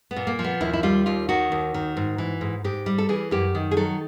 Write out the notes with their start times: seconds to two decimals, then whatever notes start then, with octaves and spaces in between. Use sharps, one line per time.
0.11 B3
0.16 A#2
0.27 A#3
0.39 F3
0.44 B3
0.61 D#2 E4
0.73 E4
0.83 G3 F4
1.06 D#2 F4
1.29 D#3 F#4
1.52 D#2
1.74 D#3
1.97 G#2
2.18 E3
2.41 G#2
2.64 G#2 G4
2.86 G3
2.98 A4
3.09 E3 G#4
3.31 F#2 G4
3.55 D#3
3.71 G#4
3.77 F#3 A4